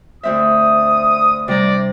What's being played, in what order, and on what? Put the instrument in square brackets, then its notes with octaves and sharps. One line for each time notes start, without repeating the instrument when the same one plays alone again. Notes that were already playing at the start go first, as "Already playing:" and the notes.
[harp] D2 C4 E5 [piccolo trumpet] D#6
[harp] C3 G3 A#5 [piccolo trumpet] D5